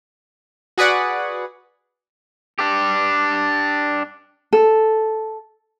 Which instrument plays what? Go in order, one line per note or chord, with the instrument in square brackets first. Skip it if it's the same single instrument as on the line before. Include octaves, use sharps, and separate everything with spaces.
[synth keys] F#4 G#4 B4 D5 F#5
[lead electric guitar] D4 G4
[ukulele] A4